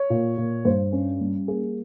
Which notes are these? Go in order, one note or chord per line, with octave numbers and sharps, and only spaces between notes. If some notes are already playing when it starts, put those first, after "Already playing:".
Already playing: C#5
A#2
A#2
G2 C5
C#4
G3
A#3 G#4